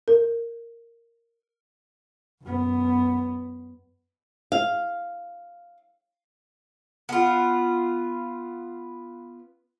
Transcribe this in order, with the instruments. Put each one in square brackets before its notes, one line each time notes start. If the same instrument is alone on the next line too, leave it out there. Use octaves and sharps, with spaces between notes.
[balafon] A#4
[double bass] F#2 B3
[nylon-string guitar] F5
[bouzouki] B3 F4